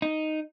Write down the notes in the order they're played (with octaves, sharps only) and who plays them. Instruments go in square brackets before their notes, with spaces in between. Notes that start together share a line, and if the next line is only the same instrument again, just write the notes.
[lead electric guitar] D#4